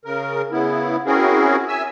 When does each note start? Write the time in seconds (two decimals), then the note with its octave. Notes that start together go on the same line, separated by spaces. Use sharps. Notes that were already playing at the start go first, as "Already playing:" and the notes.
0.05 C#3 A#4
0.52 C#3 B3 E4
1.06 C4 C#4 E4 F#4 G#4 A#4
1.68 E5 G#5 E6